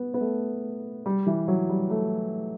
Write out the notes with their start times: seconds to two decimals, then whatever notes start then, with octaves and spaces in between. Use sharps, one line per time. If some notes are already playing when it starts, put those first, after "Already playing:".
Already playing: B3
0.14 B3
0.20 A3
1.06 G3
1.27 E3
1.48 F#3
1.69 G3
1.90 A3